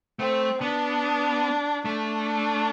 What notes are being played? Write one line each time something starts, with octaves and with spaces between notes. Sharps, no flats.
A3 C4
B3 D4
A3 D4